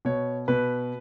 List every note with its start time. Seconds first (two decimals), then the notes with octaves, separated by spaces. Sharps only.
0.05 B2 C#5
0.48 B2 B4